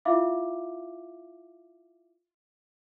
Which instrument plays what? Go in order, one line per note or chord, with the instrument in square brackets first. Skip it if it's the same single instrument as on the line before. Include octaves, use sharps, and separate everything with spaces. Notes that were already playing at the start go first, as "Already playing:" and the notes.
[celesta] E4 F4 E5 F5 D6